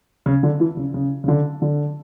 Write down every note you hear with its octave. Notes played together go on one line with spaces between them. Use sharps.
C#3
D3
E3
C#3
C#3
C#3
D3
D3